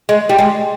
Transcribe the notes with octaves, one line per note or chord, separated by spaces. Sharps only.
G#3
G3
G#3